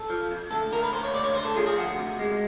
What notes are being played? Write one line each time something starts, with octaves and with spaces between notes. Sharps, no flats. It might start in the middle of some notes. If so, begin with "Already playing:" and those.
Already playing: A4
F3
F2
D2 A4
D2 A#4
B4
D2 C5
C#5
D2 D5
C#5
D2 C5
A4
F3 G#4
G#4
D2 F#4
C3
G#3